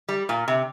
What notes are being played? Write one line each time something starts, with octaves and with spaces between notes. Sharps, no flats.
G3
A#2
C3